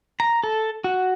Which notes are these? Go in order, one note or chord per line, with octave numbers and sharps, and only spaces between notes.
A#5
A4
F#4